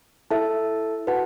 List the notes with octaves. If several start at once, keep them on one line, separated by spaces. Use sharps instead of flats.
E4 A4 E5 A5
F#4 B4 F#5 A5